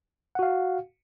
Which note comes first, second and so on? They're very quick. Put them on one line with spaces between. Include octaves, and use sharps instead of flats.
F#5 F#4 F5